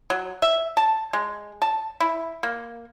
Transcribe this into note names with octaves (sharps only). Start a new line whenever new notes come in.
F#3
E5
A5
G#3
A5
E4
A#3